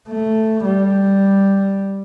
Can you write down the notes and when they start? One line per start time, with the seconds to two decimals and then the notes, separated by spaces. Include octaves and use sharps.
0.09 A3
0.65 G3